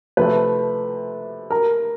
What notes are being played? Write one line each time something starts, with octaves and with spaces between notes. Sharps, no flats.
C3 F3 A3 B4
A#4